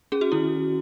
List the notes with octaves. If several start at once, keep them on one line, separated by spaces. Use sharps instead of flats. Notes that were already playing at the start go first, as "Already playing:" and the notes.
C#4 G#4
F#4
D#3 E4